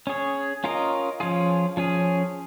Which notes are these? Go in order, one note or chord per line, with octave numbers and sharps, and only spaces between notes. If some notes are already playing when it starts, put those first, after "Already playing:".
C#4 G#4 C#5
C#4 F4 A#4 D#5
F3 C#4 F4 G#4
F3 C#4 G#4